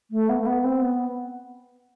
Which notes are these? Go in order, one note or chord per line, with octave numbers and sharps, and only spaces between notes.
A3
B3
A3
B3
C4
B3